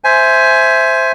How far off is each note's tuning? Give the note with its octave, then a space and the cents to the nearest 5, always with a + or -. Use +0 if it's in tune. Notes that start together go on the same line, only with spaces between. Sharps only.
C5 +0 E5 +0 G#5 +15